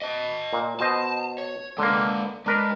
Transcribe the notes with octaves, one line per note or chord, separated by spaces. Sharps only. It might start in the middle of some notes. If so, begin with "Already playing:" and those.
D#5 A5
A#2
B2 C5 D#5 A5
C#5
D3 G#3 A#3 B4
G#3 D4 A#4 B4